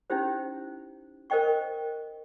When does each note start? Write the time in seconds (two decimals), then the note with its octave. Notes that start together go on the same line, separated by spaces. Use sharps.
0.10 C#4 D#4 E4 G4 C5
1.30 A#4 C5 D#5 G5 C#6